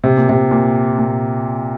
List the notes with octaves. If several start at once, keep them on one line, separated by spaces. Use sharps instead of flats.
C3
A#2
C3
A#2
A#2